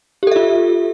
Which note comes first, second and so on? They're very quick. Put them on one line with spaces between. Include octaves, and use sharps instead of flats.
G4 A4 E5 F4